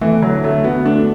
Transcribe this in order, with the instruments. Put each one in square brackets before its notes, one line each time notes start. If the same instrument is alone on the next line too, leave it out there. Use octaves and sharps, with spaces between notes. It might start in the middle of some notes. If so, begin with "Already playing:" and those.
[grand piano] E3 [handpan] A3
[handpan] D3 [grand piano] F#3
[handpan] D3 [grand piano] A3
[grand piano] B3 [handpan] F#4
[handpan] A3 [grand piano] D4